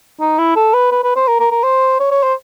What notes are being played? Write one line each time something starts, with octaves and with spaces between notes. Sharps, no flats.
D#4
E4
A4
B4
B4
B4
C5
A#4
A#4
A#4
C5
C#5
C#5
C5